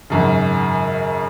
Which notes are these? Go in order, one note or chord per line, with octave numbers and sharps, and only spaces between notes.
G#1 F#2 C#3